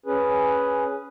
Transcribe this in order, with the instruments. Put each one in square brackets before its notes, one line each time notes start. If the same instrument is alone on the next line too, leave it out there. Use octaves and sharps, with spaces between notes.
[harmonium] C#4 G#4 B4